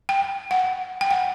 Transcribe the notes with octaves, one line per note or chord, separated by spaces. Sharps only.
G5
F#5
G5
F#5